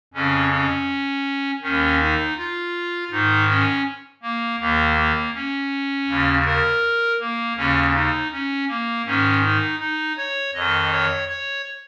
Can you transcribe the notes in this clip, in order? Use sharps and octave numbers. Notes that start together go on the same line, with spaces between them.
F2 C#3 C#4
C#4
D#2 D#3 C#4
D#4
F4
G#2 D#3 D#4
C#4
A#3
D#2 D#3 A#3
A#3
C#4
D#2 C#3
A#4
A#3
D#2 C#3 C#4
D#4
C#4
A#3
G#2 D#3 C#4
D#4
D#4
C#5
F2 D#3 D#5
C#5
C#5